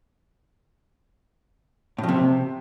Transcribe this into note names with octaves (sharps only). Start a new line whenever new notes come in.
A2
F2
C3